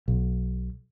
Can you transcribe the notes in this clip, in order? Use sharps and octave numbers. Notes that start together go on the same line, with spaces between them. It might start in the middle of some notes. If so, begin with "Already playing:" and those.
B1